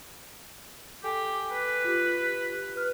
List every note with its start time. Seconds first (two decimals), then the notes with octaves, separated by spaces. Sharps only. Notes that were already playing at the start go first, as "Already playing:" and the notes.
1.04 G4 A4 G5 G#5
1.52 B4
1.84 F4 G4
2.76 B4 F6 F#6